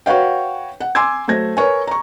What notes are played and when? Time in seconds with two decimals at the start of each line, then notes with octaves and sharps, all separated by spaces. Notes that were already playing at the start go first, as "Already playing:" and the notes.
0.06 F#4 B4 C#5 F5 G5
0.80 F#5
0.95 G#5 C6 D6 E6 G#6
1.28 F#3 A3 C5 G#6 A#6
1.57 A#4 B4 C#5 G#5
1.87 A#5 C#6